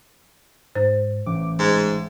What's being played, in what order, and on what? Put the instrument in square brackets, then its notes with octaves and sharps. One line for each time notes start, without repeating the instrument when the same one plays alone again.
[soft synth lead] G#2 [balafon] C5
[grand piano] A1 [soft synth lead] D6
[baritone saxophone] G#2 [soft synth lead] G#3